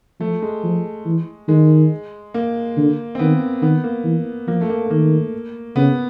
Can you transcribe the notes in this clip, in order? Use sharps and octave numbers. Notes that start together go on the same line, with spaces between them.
F3 A3
G#3
F3
E3
D#3 G#3
A#3
D3
C4
D#3 B3
D#3 B3
A#3
E3
F3 A#3
A3
A#3
A3
D#3 A#3
C#3 B3